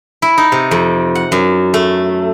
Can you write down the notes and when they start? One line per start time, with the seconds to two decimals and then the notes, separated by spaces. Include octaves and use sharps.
0.22 E4
0.38 D#4
0.52 C3
0.71 F2
1.15 F#5
1.32 F#2
1.74 A3